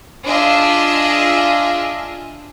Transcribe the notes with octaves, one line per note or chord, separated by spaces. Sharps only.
D4 F4 G#4 D#5 E5